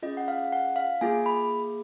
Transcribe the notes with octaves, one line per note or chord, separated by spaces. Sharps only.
C#4 F4 G#4 D#5
F#5
F5
F#5
F5
A#3 F4 G#4 G#5
B5